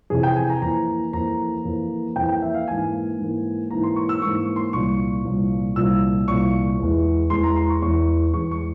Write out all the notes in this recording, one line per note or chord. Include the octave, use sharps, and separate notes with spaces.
F2 C3 E3 G#4
G5
G#5
A#5
F2 E3 A#3 A#5
F2 E3 A#3 A#5
F2 E3 A#3
F2 E3 A#3 G5
G5
E5
F5
G#2 E3 A#3 G#5
G#2 E3 A#3
G#2 E3 A#3 A#5
C6
C#6
E6
G#2 E3 A#3 C#6
C6
C2 A#2 F3 C#6
C2 A#2 F3
C2 A#2 F3 E6
C2 A#2 F3 C#6
E2 E3 G#3
E2 E3 G#3 C6
A#5
C6
C#6
E2 E3 G#3 C#6
E2 E3 G#3 C#6
C#6